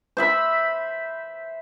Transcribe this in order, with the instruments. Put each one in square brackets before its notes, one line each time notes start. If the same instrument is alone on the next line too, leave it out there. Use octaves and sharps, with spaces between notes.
[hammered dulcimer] C5 E5 B5